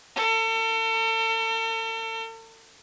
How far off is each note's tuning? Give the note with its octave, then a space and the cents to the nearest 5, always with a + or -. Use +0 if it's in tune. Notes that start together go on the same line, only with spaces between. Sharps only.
A4 +40